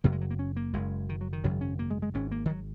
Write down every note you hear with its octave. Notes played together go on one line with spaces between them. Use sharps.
F#1 F#2 C#3 A#3
G#3
F#3
A#3
C#4
A#3
F#1 F#2 C#3 G#3
D#3
F#3
D#3
G#1 F#2 C#3 F#3
C#4
A#3
G#3
G#3
G#1 G#2 C#4
A#3
D#3
F#3